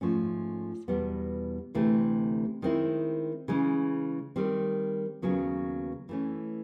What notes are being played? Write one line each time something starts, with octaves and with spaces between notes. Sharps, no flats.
G#2 F3 A3 C#4
E2 B2 G3 B3
D2 C3 E3 A3 C4
D#3 G#3 C4 E4
C#3 E3 G#3
D#3 G3 C4
D#2 C#3 F#3 B3
E3 A3 C#4